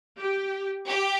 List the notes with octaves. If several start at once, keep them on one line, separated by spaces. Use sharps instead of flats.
G4
G4